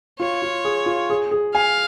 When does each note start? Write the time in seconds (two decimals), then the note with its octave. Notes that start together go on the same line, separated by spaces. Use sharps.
0.19 F4 C#5
0.42 F4
0.64 G#4
0.86 F4
1.10 G#4
1.31 G#4
1.54 F5 G#5